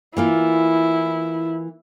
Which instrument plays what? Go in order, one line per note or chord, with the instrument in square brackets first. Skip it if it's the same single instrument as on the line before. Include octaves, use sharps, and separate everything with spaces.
[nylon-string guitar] E3 A#3 F4 [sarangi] E4